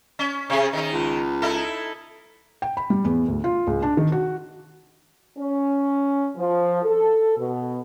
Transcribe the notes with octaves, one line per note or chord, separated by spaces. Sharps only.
C#4
C3 C#4 G#4
D#3 D#4
C#2
D#4 E4 A4
G5
B5
G3
E2
D2
F4
C#2
D4
D#3
F#4
C#4
F3
A4
B2